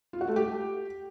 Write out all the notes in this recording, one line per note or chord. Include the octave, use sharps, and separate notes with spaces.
F4
F#4
A3
G4